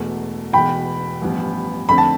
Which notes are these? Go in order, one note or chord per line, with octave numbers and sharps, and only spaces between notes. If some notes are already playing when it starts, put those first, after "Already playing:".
Already playing: E1 E2 B2 A3
E1 E2 B2 G5 B5
A1 G2 F3 B3
F2 D3 A3 C4 B5
A5